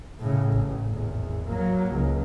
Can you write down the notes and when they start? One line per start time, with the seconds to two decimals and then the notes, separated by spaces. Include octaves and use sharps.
0.20 A2 C#3
0.52 A1
0.85 G#1 E2
1.47 F#3 A#3
1.91 C#2